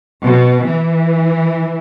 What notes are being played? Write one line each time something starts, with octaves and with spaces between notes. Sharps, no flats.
B2
E3